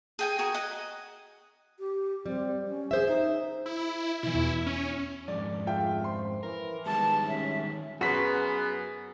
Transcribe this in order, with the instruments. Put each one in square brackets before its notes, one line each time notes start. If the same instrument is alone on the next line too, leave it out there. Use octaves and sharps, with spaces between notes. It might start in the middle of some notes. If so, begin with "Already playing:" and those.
[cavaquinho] G#4 G5 G#5
F#4 G#4 A#4
D#5 F#5 G#5
[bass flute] G4
[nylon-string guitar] G3 [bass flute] C4
[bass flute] C#4
[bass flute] G#4 [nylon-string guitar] C5 E5
[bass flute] D#4
[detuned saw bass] E4
[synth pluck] B2 E3 [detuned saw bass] E4
[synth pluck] E2
[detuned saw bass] C#4
[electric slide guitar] F2 G#2 [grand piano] D5
[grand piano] F4 E5 G5 [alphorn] G#4
[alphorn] C5 [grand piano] C6
[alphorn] E3 [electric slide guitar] A#4
[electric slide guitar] D#3 G3 G#3 [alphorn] B3 [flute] A5
[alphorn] C#4 [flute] E5
[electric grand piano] F#2 B6 [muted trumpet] B3 [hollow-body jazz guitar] F#4 B4 [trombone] G#4